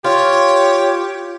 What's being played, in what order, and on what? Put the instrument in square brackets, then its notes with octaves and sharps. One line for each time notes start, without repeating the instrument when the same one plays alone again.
[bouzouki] F4 [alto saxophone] G4 [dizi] C#5